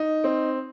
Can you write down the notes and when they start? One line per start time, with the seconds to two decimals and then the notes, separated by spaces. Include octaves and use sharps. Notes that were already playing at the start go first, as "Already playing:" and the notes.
Already playing: D#4
0.24 C4